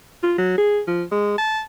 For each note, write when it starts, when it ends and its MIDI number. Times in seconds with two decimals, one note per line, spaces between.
0.23 0.35 65
0.38 0.54 54
0.58 0.81 68
0.87 1.04 53
1.12 1.37 56
1.38 1.62 81